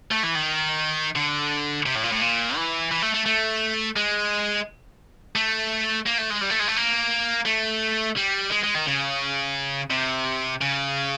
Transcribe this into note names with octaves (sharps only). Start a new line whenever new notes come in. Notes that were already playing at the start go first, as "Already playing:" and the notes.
A3
E3
D#3
D3
C3
A2
A#2
A2
A#2
E3
E3
A3
A3
A3
G#3
A3
A#3
A3
G#3
G3
A3
G#3
A3
A#3
A3
G3
G#3
G#3
D#3
C#3
C3
C#3